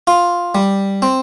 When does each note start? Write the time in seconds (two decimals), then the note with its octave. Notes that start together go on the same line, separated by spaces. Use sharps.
0.07 F4
0.55 G3
1.02 C4